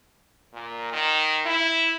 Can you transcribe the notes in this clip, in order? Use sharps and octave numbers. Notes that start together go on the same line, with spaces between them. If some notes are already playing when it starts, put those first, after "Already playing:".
A#2
D#3
E4